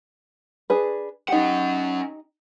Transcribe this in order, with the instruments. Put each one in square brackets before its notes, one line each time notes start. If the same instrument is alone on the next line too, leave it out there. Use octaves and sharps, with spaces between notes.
[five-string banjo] D4 G#4 B4
[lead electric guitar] C#4 F#5 [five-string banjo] D#4 G4